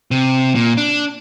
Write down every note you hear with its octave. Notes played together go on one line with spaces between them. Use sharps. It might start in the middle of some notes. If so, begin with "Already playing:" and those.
C3
A#2
D4